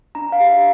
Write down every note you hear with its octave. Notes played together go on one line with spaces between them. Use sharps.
D4 A#5
F5
G4
E5